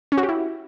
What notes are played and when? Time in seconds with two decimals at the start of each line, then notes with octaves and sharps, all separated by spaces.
0.12 C#4
0.18 F#4
0.23 G4
0.29 E4